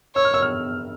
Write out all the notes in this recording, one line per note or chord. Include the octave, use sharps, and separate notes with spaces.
C#5 E6
F6
E6
F6